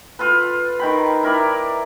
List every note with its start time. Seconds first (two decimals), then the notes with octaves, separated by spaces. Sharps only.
0.19 F4 A4 B4
0.79 D#3 G5 B5
1.23 E4 A#4 D5 E5